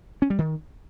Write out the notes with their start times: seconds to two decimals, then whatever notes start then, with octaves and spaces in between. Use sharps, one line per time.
0.22 C#4
0.30 G3
0.39 D#3